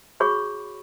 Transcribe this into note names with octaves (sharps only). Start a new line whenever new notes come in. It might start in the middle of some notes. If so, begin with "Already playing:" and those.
F#4 G#4 C#5 B5 C#6